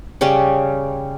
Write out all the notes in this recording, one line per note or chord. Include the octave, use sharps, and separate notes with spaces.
C#3 G3 C#4